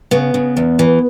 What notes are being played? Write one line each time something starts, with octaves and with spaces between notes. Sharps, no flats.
C#3 B3
C#3
E2
E3